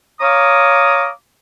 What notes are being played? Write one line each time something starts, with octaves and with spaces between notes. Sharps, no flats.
C#5 F5 A#5 D6 D#6